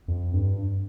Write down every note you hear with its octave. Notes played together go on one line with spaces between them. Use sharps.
F2
G2